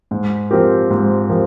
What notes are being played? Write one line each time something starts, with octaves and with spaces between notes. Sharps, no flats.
G#2
F3 C4 G4 A#4
G#2
F3 C4 G4 A#4